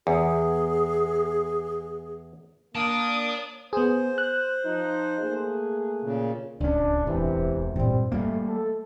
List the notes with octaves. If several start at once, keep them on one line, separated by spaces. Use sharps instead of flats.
E2 G#4
A#3 D5 A5 D#6 D7
B3 G#4 C5
F#6
F3 D#4
A3 A#3 G#4
A#2 C#3
D1 C#2 C#4 D4
E1 C3 E3
G2 A#2 G3 C4
G3 A3 A#3 F4
A3 A4